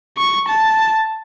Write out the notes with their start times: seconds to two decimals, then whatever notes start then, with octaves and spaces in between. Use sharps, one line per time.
0.18 C#6
0.48 A5